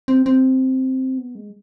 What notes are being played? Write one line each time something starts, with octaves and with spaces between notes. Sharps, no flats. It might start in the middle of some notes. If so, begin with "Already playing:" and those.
C4
C4
B3
G#3